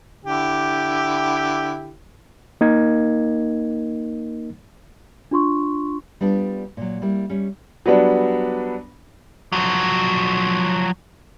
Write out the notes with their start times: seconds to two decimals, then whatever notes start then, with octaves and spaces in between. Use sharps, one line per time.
0.25 D3 E4 G4
2.61 A#3 D#4 A#4 D#5 G#6
5.31 D4 F4 C6 C#6
6.21 G3 B3 D4 F4
6.77 A#2 F#3
7.02 G3 A#3 E4
7.30 G3 C#4
7.86 F#3 G3 B3 D4
9.52 F3 F#3